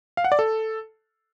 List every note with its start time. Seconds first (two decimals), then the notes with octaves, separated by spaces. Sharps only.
0.17 F5
0.24 F#5
0.32 D5
0.39 A4